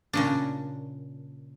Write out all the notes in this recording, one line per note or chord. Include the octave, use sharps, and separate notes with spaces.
A#2 C#3 D4